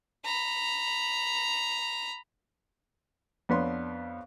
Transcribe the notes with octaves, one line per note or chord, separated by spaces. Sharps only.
A#5 B5
F2 B3 D4 B4 C#5 C6